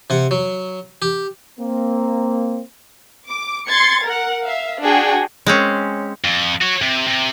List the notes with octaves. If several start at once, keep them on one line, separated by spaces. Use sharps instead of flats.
C3 F#5
F#3
G4
A#3 C4
D6
C6 G#6 A6 C#7
A#4 F#5
E5 F5
D4 F#4 G#4 G5
G#3 C4 C#4
F2
F#4 C#5
C3
C3